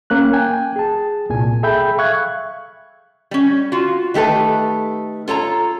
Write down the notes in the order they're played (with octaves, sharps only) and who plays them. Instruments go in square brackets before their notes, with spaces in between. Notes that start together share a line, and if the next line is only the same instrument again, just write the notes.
[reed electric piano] A#3 C#4 F#6
G5 G#5
G#4 A5
C2 A#2 G#5
G#4 A4 E5 G5 B5 G6
E5 F5 C#6 F#6 G#6
[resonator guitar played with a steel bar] G3 C#4
F4 F#4
D#3 A3 G4 A4 B4
F4 A4 C#5 A#5